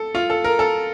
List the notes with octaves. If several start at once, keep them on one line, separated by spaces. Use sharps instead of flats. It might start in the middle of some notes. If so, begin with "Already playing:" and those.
Already playing: A4
F4
A4
A#4
A4